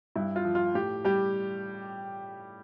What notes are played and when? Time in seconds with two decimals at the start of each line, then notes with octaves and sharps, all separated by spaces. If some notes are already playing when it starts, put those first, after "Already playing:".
0.16 G2 E4
0.36 F4
0.45 F3
0.55 F4
0.74 A2 G4
1.04 G3 G4